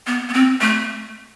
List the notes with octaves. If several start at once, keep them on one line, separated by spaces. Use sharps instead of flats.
B3
B3
C4
A3